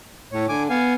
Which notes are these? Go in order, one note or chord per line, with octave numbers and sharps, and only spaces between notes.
A2 C#5
D3 G#5 D6
B3 F5 G#5